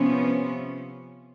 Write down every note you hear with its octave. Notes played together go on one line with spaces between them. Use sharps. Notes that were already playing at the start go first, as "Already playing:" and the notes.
Already playing: C3 F3 B3 C#4